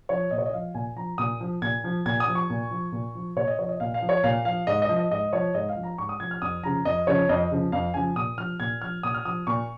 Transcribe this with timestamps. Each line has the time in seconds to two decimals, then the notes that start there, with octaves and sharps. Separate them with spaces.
0.09 F3 C#5
0.31 A#2 D#5
0.38 C#5
0.46 D#5
0.53 F3 F5
0.74 A#2 G#5
0.96 F3 A#5
1.18 A#2 D#6
1.40 F3
1.62 A#2 G#6
1.84 F3
2.06 A#2 G#6
2.20 D#6
2.28 F3
2.35 C#6
2.50 A#2
2.71 F3
2.92 A#2
3.15 F3
3.36 A#2 C#5
3.47 D#5
3.59 F3 C#5
3.69 D#5
3.80 A#2 F5
3.94 F5
4.02 F3
4.09 C#5
4.24 A#2 F5
4.45 F3 F5
4.67 G#2 D#5
4.82 D#5
4.89 F3
4.96 D#5
5.11 G#2 D#5
5.33 F3 C#5
5.54 G#2 D#5
5.69 F5
5.76 F3
5.83 A#5
5.98 G#2 C#6
6.09 D#6
6.20 F3 G#6
6.31 F6
6.42 F2 D#6
6.63 C#3 F3 A#5
6.85 F2 D#5
7.07 C#3 F3 C#5
7.29 F2 D#5
7.51 C#3 F3
7.72 F2 F5
7.94 C#3 F3 G#5
8.16 A#2 D#6
8.38 F3 F6
8.60 A#2 G#6
8.82 F3 F6
9.03 A#2 D#6
9.14 F6
9.25 F3 D#6
9.47 A#2 C#6